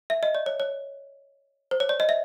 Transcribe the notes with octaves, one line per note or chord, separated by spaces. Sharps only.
E5
D#5
D5
C#5
C#5
C5
C#5
D5
D#5
E5